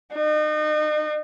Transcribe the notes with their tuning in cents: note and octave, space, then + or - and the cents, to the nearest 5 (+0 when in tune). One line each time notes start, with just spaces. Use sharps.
D#4 -35